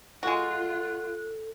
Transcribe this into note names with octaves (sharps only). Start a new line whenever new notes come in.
G#3 F4 F#4 A4 F#6